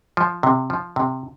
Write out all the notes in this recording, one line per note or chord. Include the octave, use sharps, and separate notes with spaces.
F3
C3
F3
C3